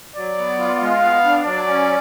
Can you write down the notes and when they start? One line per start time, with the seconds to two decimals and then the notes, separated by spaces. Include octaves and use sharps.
0.16 F#3 D5
0.37 B3
0.59 F4
0.80 G#3 F5
1.03 B3
1.23 D4
1.45 F#3 D5
1.67 C#4